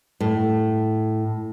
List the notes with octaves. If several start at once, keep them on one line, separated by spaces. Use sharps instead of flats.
A2